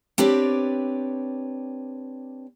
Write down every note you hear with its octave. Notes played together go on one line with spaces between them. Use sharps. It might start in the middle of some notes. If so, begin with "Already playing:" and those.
C4 D4 G4 B4 C#5 D5